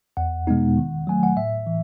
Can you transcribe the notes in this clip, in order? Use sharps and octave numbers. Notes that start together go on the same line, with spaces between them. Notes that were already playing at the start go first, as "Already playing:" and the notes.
E2 F#5
B2 G#3 B3 D#4
D#3
F#3 A3 G#5
F#5
A2 E5
E3